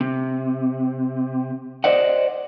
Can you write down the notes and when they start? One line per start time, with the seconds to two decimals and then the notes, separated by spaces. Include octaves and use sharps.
0.01 C3
1.84 C5 D5 D#5 F#5